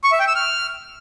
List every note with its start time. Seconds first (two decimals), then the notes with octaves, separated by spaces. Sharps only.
0.04 C#6
0.12 E5
0.20 G5
0.27 E6
0.35 F6